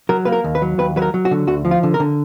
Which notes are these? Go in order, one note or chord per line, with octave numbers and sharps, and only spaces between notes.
F#3 A#4
A#3 B4
A#4
D#2
B4
F#3
D#2 B4
F#3 B4
A#4
F#3
F#4
D3
D2 F#4
F3
F4
D3
A#4
D3